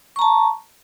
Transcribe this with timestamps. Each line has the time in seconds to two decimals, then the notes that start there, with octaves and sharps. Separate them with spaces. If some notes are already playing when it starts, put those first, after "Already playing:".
0.16 C#6
0.19 A#5
0.22 A5